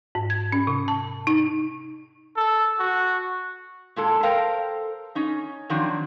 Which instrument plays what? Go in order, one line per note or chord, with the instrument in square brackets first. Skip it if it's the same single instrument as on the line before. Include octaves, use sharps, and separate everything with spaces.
[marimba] G#2
G#6
C#4
C3
A5
D#4
[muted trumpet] A4
F#4
[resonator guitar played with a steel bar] A#2 G#3 A4
A4 A#4 C5 F5 G5
C#4 D#4
D#3 F3 F#3 C4 D4